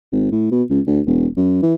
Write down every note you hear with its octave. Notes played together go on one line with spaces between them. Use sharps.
G#1
A2
B2
C#2
D2
E1
F#2
E3